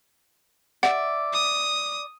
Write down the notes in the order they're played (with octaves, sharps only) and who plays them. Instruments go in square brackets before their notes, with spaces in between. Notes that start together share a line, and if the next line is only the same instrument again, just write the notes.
[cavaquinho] D5 E5 [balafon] F#5
[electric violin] D#6